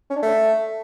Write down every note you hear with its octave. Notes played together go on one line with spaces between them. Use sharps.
C#4
D4
A3